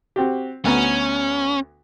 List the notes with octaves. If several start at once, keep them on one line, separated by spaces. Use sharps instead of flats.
C4 F#4 G4
D2 B3 C#4 A#5